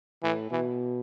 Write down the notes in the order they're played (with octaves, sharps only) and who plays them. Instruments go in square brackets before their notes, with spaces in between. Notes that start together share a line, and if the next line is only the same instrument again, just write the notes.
[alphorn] A2 [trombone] E3
[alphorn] B2 [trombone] E3